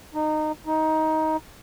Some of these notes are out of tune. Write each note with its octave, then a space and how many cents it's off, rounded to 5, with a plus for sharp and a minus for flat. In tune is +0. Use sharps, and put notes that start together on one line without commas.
D#4 -20
D#4 +15